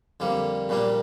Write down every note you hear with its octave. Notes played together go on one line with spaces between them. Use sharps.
F2 D3 G3 A#3
A#1 A#2 G3 A#3 D4